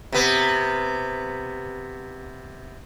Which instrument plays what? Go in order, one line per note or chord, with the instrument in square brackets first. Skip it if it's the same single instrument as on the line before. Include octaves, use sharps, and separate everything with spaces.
[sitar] C3 B3